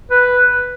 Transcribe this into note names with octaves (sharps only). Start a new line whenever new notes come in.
B4